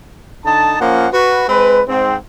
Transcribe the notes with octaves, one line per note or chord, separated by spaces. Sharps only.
D3 D#4 A5
A#2 F3 A#3 C#4 F#5
F#4 B4
G#3 C4 B4
G#2 C4